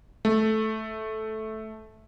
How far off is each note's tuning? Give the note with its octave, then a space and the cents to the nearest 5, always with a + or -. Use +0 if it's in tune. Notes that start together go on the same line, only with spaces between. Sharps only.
A3 -10